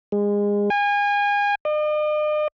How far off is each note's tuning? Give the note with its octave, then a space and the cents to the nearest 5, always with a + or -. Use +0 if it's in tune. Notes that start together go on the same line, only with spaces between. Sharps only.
G#3 -25
G#5 -30
D#5 -45